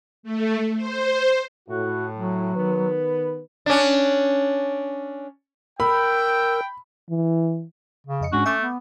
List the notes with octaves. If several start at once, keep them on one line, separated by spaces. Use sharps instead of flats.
A3
C5
A2 F#4
F#3
D#3 B3 B4
C#4 D4
A#4 G5 B5 E6
E3
C#3
F2 D#5 C#7
G#2 G#3 C#4 D4 F#4
A3 E5 D6
B3